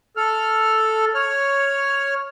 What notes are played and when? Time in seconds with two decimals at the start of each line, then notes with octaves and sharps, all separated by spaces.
0.17 A4 F6
1.15 C#5 F6